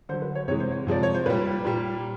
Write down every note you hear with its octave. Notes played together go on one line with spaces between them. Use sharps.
D3 F#3 C5
B4
C#5
C3 E3 G#3 C#5
C5
C#5
C3 F3 G#3 D5
C#5
C5
A#2 G3 B4
A#2 G3